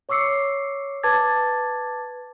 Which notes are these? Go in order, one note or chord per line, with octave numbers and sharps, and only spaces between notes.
C#5 C#6 D6 E6 C7 C#7
B4 A5 D6 G#6 A6